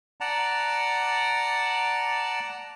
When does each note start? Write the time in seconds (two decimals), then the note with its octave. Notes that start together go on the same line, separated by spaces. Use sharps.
0.21 D5 F#5 A5 A#5